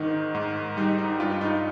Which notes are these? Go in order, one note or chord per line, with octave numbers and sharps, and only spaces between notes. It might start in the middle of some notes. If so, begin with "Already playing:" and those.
Already playing: G#2 D#3 D#4
G#2
G3 D#4
D#4
G2 F4
D#4